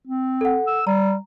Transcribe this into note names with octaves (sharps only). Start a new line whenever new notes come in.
C4
A4 F#5
E6
G3 A#5